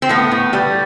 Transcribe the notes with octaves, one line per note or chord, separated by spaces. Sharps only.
C4
A2 B3
A2
G3